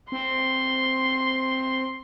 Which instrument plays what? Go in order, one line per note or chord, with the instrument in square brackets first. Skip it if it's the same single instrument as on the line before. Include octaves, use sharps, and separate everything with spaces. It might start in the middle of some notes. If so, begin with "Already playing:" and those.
[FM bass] C4 [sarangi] C6